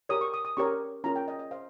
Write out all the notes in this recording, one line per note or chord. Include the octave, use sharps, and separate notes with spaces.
G4 A#4 C#5 D#6
C#6
D#6
D#6
C#4 G4 A#4 C#5 C#6
C#4 F4 A#4 A#5
G5
D#5
D#5
C5 F5